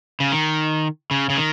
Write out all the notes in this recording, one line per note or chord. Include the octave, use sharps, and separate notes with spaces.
C#3
D#3
C#3
C#3
D#3